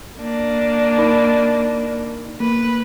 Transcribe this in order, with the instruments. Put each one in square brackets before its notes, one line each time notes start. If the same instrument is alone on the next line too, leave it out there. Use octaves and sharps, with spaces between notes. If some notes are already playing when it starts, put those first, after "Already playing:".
[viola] A#3 D4
[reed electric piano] D#4 A#4 B5
[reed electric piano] A#3 [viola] B4